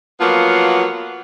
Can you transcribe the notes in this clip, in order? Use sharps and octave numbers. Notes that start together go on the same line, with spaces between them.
F3 F#3 A#3 B3 F4